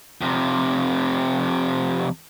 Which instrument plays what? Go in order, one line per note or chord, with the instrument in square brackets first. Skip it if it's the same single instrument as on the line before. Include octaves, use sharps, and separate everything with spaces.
[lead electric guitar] F2 C3